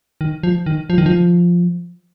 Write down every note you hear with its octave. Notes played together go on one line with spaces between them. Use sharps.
D#3
F3
D#3
F3
D#3
F3